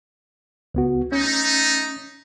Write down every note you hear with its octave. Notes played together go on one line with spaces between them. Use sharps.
C#2 B3 F#4
A3 C#4 D#4